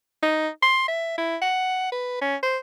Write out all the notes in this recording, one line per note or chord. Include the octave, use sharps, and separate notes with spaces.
D#4
C6
E5
E4
F#5
B4
C#4
C5